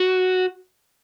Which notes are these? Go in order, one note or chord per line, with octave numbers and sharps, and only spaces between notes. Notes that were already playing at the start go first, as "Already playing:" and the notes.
Already playing: F#4